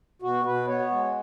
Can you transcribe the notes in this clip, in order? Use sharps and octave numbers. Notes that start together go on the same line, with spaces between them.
B2 F#4
B2 B4
B3 C#5
G#3